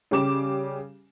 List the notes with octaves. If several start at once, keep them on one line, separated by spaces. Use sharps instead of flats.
C#3 G3 G4 D6 E7